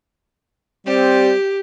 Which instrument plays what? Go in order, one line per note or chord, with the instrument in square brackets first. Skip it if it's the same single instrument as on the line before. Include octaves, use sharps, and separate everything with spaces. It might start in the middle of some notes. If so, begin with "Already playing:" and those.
[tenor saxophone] G3 [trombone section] C4 [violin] G4